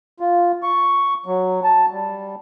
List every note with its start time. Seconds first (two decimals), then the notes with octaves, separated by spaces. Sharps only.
0.20 F4
0.63 C#6
1.26 F#3
1.64 A5
1.92 G3